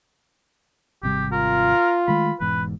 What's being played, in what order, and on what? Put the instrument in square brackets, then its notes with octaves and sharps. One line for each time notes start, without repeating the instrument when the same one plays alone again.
[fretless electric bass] G#1 C3 G3 [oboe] G4
[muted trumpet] F4 [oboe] A#4
[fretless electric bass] D#3 G#3 A3 [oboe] B5
[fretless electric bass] E1 E2 G#2 [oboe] B4